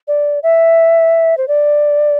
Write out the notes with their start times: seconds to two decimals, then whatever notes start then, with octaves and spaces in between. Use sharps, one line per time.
0.08 D5
0.43 E5
1.38 C5
1.48 D5